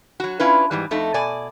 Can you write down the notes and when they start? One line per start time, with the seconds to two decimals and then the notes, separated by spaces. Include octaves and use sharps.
0.20 F#3 F#4
0.39 C#4 D4 E4 F4 B4
0.71 G#2 E3 G3
0.91 F2 A3 D#4
1.14 B2 D5 G#5